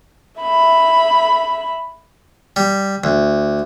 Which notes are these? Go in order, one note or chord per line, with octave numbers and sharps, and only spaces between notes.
E5 B5
G3
D2